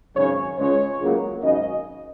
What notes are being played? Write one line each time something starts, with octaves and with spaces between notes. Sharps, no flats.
G#1 F#2 C#3 C#5
C#2 C#3 G#3 C#5
C#2 C#3 F#3 A#3
G#1 F#2 C#3 D#5